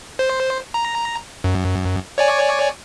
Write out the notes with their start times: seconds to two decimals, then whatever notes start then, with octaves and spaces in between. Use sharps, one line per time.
0.19 C5
0.74 A#5
1.44 F#2
2.18 C#5 D5 G#5